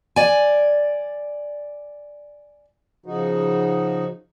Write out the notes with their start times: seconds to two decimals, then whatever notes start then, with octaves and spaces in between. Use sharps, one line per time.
0.16 D5 G#5
3.06 C#3 F3 D#4 F#4